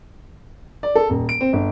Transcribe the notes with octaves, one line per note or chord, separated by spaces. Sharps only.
D5
A4
D#1
D7
C4
G1